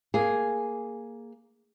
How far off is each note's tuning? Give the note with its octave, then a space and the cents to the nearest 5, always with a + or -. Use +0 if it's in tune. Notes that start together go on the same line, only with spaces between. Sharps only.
A#3 +0 G#4 +0